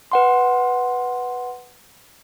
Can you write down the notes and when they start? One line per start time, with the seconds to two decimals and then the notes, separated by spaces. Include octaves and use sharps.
0.12 B4 F#5 C6